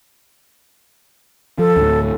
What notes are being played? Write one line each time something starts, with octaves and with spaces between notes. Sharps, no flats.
F3 A4
D2 A2